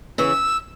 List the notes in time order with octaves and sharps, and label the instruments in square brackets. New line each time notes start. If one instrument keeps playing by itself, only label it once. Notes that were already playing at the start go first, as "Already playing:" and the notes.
[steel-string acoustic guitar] C#3 E3 [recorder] E6